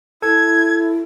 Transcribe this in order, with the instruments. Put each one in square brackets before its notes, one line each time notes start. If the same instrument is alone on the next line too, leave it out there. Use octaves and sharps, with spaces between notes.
[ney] E4 [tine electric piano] A4 [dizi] G#6